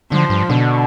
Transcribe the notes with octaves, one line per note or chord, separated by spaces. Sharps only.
D3 F3
G2
B2 D3